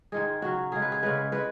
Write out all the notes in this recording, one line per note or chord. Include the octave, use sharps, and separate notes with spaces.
G#2 D#3 G#3 G#4
C#3 F#3 F#4
C#3 G#3 G#4
B4
G#4
C#3 G#3 B4
G#3 B4